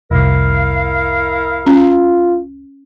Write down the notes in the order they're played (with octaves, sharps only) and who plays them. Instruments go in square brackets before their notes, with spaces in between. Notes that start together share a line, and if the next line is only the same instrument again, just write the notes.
[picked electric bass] F1 C2 [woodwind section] E4 A#4 F5
[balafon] C#4 [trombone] F4